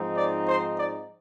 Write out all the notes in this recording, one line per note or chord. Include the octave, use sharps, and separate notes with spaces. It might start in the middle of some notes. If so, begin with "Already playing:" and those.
Already playing: G#2 F3 C4 D#4
D5
C5
D5